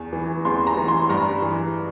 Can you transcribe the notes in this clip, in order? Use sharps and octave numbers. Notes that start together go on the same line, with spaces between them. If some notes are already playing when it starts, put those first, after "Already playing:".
Already playing: E2
E3
E2 C6
A#5
E3
C6
G2 A#5
E3